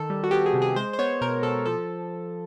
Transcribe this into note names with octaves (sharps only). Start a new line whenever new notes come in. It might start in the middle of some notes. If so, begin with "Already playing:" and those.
Already playing: D#3 A4
G3
F#4
B3 G4
G#4
C3
G#4
G#3 C5
C5
B3 C#5
B2 A#4
B2 A4
F3 A4